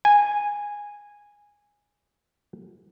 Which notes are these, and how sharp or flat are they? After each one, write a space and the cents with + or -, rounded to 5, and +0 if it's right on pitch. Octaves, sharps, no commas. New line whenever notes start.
G#5 -10